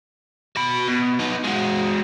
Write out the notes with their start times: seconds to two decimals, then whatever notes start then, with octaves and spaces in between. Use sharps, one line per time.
0.56 F#4 B5
0.87 B2
1.19 B3 D#4
1.44 G#3 F#4